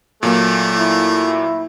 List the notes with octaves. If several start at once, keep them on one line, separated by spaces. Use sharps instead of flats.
A#2 F#3 A3 A#3
E4